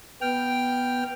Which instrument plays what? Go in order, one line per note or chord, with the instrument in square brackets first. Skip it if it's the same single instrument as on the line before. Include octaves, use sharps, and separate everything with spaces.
[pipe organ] B3 F6 [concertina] G5